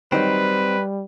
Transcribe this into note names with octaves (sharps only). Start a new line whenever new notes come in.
D#3 F#3 G3 C4 D#4 B4